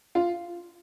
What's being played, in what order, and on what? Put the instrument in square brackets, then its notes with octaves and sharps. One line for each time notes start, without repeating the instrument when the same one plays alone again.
[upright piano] F4